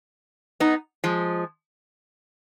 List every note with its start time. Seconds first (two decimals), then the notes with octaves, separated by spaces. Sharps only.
0.60 B3 D#4
1.04 F3 G#3